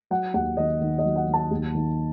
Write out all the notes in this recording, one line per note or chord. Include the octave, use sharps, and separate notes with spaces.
F#3 F#5
D#2 F#5
D#3 D#5
D#3
D#5
F#3
F#5
D#3
A5
D#2
D#3